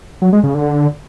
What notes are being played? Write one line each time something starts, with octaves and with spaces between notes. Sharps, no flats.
F#3
G#3
C#3
D3